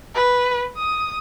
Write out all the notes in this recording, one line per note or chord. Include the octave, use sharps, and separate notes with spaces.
B4
D#6